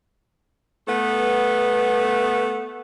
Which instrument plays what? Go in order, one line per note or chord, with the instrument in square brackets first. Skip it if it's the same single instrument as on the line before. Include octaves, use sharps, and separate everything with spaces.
[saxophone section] A3 B3